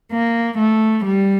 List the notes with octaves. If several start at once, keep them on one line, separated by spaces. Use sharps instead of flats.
A#3
A3
G3